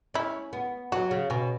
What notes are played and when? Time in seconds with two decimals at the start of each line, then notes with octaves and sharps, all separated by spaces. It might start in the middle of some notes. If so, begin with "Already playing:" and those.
0.14 C#4 E4
0.53 B3
0.92 F#3 F#4
1.11 C#3
1.30 B2 C#4